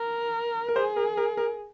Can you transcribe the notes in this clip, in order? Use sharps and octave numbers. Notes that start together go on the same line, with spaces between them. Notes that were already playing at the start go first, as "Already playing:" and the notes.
Already playing: A#4
A#4
G#4 C5
A#4
A#4
A#4